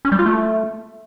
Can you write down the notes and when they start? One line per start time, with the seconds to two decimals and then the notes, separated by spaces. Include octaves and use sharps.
0.05 C#4
0.12 G3
0.19 F4
0.26 A3